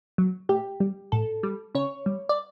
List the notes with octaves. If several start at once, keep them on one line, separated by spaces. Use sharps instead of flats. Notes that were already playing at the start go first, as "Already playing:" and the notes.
F#3
A2 G4
G3
A2 A4
G3
C#3 C#5
G3
D5